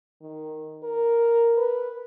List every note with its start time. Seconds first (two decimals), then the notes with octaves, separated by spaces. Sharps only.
0.22 D#3
0.84 A#4
1.58 B4